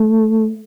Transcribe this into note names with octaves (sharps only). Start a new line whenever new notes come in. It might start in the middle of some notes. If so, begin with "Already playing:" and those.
Already playing: A3